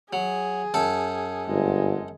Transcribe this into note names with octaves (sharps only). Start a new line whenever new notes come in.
F#3 G#4
F#2 A4 A5
G1 G#3